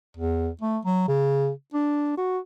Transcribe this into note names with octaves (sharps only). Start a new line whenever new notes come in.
E2
A3
F#3
C#3
D4
F#4